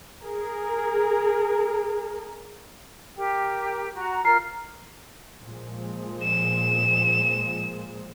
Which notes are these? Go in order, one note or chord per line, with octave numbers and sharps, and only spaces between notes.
G#4 A#4
G4 A#4 G5
F#4 A#5
F4 A#4 A#5 F6 C7
A#2 F3 G#3
E7